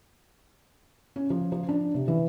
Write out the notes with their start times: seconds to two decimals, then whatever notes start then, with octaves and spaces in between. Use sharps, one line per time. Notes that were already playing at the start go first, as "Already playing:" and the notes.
1.16 C#4
1.30 F3
1.52 F3
1.69 D4
1.94 C3
2.08 E3